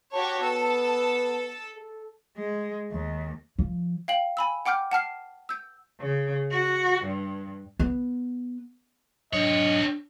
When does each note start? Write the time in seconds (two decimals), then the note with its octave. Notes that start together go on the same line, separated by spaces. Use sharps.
0.13 F#4 G4 C#5 A5
0.42 B3 A4
1.76 A4
2.37 G#3
2.91 D#2
3.58 F3
4.08 F5 G5 F#7
4.37 G#5 B5 E6
4.66 F#5 G5 D6 F6 G6
4.91 F#5 A5 F6 C7
5.49 E6 G6
6.00 C#3
6.50 F#4
7.04 G2
7.79 B3
9.33 G#2 B2 F#3 C4 D4 C#5 D#5